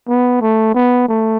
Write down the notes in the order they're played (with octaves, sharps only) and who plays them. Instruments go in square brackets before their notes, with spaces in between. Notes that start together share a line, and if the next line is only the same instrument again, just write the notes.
[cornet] B3
A3
B3
A3